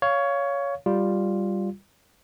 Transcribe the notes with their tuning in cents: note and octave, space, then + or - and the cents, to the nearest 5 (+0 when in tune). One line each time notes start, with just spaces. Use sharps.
C#5 +15 F5 +0
G3 +0 F4 +0